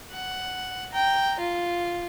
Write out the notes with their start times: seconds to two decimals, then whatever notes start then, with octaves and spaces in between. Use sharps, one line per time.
0.12 F#5
0.92 G5 A#5
1.39 F4